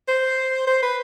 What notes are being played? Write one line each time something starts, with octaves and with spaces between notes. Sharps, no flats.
C5
C5
B4